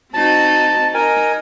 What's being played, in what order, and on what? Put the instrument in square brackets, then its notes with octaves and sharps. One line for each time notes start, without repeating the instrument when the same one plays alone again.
[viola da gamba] C4 D#4 F#4 [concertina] A5
[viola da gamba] D#4 [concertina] A#4 G#5